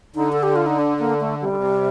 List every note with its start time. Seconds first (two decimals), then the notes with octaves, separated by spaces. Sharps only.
0.15 D3 D#4
0.33 A4
0.43 G4
0.56 F4
0.66 D#4
0.79 D4
0.99 A#3
1.20 A3
1.41 C3 G3
1.49 D3
1.56 C3